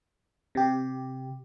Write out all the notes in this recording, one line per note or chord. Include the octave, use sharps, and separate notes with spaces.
C3 G4